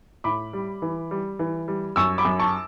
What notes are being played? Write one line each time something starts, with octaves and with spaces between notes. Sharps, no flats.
A2 B5 D6
G3
E3
G3
E3
G3
F#2 C#6 E6
B5 D6
F#2
A5 C#6